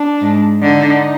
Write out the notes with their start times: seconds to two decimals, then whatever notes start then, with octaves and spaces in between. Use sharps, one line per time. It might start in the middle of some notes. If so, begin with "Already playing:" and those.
Already playing: D4
0.21 G#2
0.62 D3 D#4